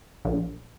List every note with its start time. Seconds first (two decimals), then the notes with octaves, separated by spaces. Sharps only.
0.25 A#1